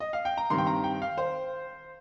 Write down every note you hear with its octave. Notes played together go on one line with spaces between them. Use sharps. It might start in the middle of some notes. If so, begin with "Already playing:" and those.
D#5
F5
G5
A#5
G2 D#3 C4 C6
G5
A#5
G5
F5
C5